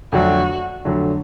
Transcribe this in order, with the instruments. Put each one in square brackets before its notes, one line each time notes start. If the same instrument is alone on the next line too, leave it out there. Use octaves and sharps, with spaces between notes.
[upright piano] F2 D3 F#3 A3 D4 [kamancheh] F#4
[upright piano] F2 D3 F#3 A3 D4